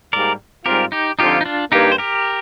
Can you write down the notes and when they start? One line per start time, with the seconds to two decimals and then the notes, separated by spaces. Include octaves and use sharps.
0.13 G#2 G3 A#3 A#4 D5
0.66 G#2 G3 C4 F4 G4 A#4
0.92 D#4 G4
1.19 D3 F3 C4 D#4 F4 G4
1.41 D#4
1.45 D4 F4
1.72 G2 D#3 A#3 D#4 G4
1.92 C5
1.98 G4 A#4